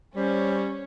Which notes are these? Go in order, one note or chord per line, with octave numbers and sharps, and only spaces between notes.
G3 C#4 C5